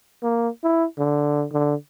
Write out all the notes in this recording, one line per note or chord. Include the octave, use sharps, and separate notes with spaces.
A#3
E4
D3
D3